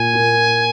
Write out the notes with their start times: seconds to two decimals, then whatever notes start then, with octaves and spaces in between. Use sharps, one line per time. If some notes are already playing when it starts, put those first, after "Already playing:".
Already playing: A#2 A#3 F4 G#5
0.13 A#2 A#3 F4